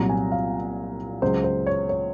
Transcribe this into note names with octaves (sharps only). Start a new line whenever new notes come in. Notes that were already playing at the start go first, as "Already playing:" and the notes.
Already playing: C2 A#2 F#3 A#5
G#5
F5
C#2 C#3 F#3 C5
C5
C#5
C#5